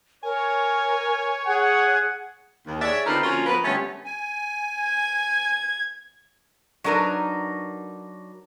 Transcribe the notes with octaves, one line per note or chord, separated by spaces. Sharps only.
A#4 C#5 G#5
G#4 F#5
D#2
G#4 C#5 D5 E5
D3 C4 D#4 F4 A#4 B4
D3 F3 A#3 C#4 F4 F#4
F3 B3 A#4 B4
D3 G3 A3 B3 C#4
G#5
G#6
F#3 D4 D#4 A#4 B4